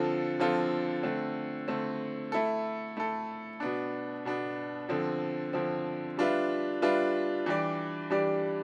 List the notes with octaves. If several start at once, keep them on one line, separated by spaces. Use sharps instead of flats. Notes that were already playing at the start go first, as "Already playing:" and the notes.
Already playing: D3 F3 C4 F4 A4
D3 F3 C4 F4 A4
D3 A3 C4
D3 A3 C4
A3 E4 A4
A3 E4 A4
B2 B3 D4
B2 B3 D4
D3 F3 C4
D3 F3 C4
G3 D4 F4 B4 E5
G3 D4 F4 B4 E5
E3 G3 D4 G4 D5
E3 G3 D4 G4 D5